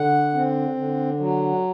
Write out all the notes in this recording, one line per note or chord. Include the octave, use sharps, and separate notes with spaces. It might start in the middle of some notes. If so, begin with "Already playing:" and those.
Already playing: D3 F#5
C4
D3
F#3